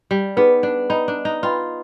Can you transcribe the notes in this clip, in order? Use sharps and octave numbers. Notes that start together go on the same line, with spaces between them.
G3
B3 D#4 G#4 B4
D4
D#4 B4 D#5 G5 B5
D4
D#4
F4 B4 D#5 G5 B5